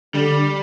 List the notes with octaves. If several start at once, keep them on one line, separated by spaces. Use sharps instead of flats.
D3 G3